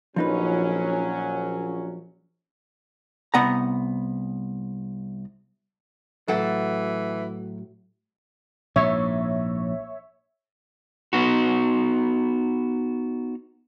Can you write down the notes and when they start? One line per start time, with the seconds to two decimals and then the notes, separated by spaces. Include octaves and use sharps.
0.16 A#1 F3 F#3 C#4 D#4 B4
3.34 C2 B3 F#5 A#5
6.28 A2 E3 F#3 A4 F#5
8.76 A#1 G#2 C#5 E5
11.13 B3 D#4 F#4